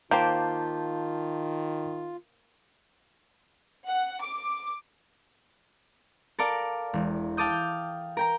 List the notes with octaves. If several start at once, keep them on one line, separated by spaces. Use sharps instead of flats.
D#3 A#3 F4 G4 C5 A5 G6
F#5
D6
A4 A#4 D5 F5
E1
F5 G5 A5 D6 D#6 G6
A#4 G5 A#5